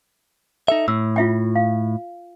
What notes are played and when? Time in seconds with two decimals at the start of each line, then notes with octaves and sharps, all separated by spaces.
0.68 D#4 A4 E5
0.88 A2 E6
1.16 F4 E5 G5
1.55 F5